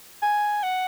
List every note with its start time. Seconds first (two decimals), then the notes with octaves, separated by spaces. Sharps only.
0.22 G#5
0.63 F#5